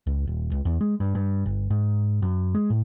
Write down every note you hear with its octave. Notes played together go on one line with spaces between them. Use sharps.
C#2
D#1
C#2
E2
G#3
G2
G2
G1
G#2
F#2
G#3
A2